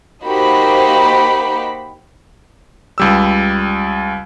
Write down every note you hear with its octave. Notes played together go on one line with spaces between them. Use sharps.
A#3 D#4 F#4 G4 C5 B5
C#2 G3 E6